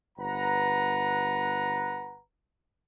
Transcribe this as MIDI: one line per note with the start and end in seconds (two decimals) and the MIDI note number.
0.18 2.20 31
0.18 2.20 71
0.18 2.20 78
0.18 2.20 82